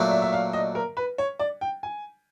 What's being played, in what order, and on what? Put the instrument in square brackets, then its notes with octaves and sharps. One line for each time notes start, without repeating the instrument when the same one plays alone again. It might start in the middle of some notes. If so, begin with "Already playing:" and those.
Already playing: [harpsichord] A#2 F#3 A3 D4
[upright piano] E5
E5
F5
D#5
A#4
B4
C#5
D5
G5
G#5